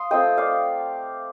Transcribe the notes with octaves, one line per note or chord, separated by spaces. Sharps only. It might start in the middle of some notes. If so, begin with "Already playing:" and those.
Already playing: F5 C6 D#6
A3 C4 F4 D#5 G5
D5 F5